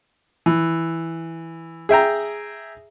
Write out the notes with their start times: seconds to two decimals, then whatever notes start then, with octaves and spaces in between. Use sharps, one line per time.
0.46 E3
1.89 G#4 E5 G5 A#5